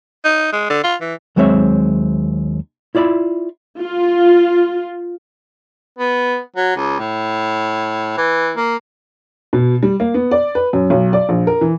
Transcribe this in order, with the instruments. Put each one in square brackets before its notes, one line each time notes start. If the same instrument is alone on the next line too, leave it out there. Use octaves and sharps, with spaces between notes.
[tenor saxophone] D#4
G#3
D3
F4
E3
[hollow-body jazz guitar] D#2 F#3 G#3 C4 C#5 E5
E4 F4 D5 E5 B5
[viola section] F4
[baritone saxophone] B3
F#3
C#2
A2
E3
A#3
[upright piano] B2
G3
A#3
B3
D5
B4
F#2
B1
D5
A#1
A#4
E3